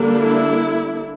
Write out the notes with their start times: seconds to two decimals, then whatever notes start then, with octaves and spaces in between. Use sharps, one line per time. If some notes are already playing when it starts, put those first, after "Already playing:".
Already playing: D3 G3 A#3 D4
0.20 E4